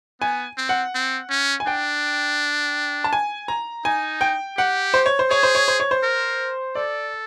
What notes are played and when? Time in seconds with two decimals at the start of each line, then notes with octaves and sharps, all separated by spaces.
0.21 B3 G#5
0.58 C4
0.69 F#5
0.95 C4
1.30 C#4
1.60 G#5
1.67 D4 G5
3.04 A5
3.13 G#5
3.48 A#5
3.85 D#4 G#5
4.21 G5
4.57 G4 F#5
4.94 C5
5.06 C#5
5.19 C5
5.30 G#4 C#5
5.43 C5
5.55 C#5
5.68 C5
5.80 C#5
5.91 C5
6.03 A#4
6.75 A4 D5